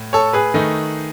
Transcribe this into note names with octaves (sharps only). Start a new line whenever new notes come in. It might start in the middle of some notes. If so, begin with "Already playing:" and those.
Already playing: A2
A4 C#5
G#4 B4
D#3 A3 D#4